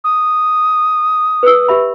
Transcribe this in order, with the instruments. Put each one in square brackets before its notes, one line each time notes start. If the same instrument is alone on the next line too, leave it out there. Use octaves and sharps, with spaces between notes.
[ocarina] D#6
[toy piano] B4 E6
G4 E5 B5